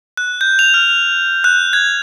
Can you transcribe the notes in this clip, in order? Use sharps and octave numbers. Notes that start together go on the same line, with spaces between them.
F#6
G6
F7
F6
F#6
G#6